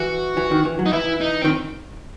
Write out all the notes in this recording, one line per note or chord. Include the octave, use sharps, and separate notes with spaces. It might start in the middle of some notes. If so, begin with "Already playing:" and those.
Already playing: E3 F#4
E3
D#3
E3
F#3
D#4
E3 E4
D#4
C4
D#3